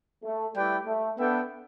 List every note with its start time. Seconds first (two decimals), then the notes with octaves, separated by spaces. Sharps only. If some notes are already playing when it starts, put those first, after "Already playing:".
0.23 A3
0.55 G3 A3 E4 B4 D5 G5
0.86 A3
1.18 B3 D4 A4 E5 G5